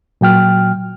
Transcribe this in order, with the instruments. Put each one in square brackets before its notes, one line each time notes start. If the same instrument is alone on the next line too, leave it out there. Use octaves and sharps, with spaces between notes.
[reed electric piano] A#2 F#3 G5 F6